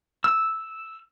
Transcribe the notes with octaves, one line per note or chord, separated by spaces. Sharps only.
E6